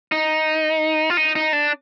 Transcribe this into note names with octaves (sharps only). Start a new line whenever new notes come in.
D#4
F4
D#4
D#4
D4